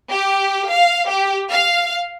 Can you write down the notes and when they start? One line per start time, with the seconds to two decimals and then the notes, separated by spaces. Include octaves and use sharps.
0.11 G4
0.70 F5
1.08 G4
1.50 F5